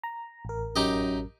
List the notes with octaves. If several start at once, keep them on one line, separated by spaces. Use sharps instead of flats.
A#5
A1 A#4
F#2 D#4 G4 D#5